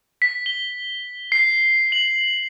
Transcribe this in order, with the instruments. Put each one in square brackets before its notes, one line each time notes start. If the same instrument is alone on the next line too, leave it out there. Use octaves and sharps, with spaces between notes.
[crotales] B6
G7
C7
F#7